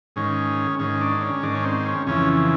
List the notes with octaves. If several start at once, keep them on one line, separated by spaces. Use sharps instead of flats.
G#2 D#3 C#4
G#2 D#3 C#4
D4
C#4
G#2 D#3 D4
C#4
C4
C#4
F2 C#3 E3 C#4